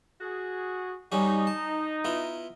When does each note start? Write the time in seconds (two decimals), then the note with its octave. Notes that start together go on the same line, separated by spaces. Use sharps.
0.21 F#4 G#4
1.12 G3 C#4 D#4 F#4
1.47 A5
2.05 B3 E4 F4